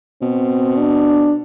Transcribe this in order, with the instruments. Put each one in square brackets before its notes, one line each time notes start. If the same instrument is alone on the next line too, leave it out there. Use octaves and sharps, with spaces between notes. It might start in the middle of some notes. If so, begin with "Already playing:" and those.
[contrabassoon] B2 [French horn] C4
[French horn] D4